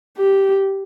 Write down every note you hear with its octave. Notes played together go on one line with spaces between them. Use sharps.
G4